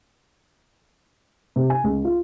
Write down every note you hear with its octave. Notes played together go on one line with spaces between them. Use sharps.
C3
G#5
C#2
F4